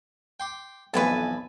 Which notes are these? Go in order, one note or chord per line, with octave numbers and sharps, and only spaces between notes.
G5 C6 D6
B1 F2 E3 B4 G#5 A5